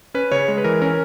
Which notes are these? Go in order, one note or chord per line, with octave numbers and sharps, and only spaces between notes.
C#4 B4
C#3 C#5
G#3
B4
E3 A#4
C#4 A#4